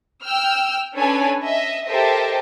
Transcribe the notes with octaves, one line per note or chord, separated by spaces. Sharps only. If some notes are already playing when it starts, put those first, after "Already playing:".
G5 E6 F6 G6
C#4 D4 A4 B4 C#5 G#5
D#5 E5
G4 A4 A#4 C5 D#5 E5